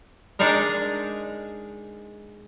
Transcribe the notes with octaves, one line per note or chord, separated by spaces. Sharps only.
G#3 D4 D#4 G#4 A#4